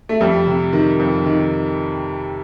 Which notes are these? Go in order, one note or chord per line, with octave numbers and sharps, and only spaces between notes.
A3
F2 G3
C3
D#3
F2
D#3